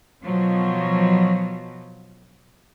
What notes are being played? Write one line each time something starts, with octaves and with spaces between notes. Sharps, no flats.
B2 F3 F#3